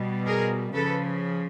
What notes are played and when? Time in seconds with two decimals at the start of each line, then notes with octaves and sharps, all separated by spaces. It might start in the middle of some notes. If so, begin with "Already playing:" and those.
Already playing: B2 G3
0.27 G#4 A#4
0.73 C#3 F3 A4 B4